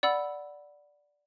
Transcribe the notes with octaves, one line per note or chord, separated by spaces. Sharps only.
D5 F#5 B5 E6